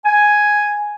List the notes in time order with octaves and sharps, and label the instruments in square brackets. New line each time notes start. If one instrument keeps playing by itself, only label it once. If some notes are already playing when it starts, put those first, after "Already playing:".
[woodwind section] G#5